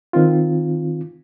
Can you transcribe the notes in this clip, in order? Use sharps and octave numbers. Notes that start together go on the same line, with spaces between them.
D#3 C4 F4